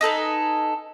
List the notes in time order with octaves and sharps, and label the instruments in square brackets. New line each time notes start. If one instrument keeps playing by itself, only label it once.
[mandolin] D#4 A4 B4 G#5